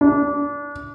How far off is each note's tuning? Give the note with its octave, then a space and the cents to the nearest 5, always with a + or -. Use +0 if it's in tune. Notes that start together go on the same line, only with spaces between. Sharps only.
D4 -25